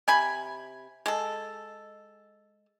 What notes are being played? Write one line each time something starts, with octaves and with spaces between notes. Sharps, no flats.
C3 G#5 B5
G#3 A4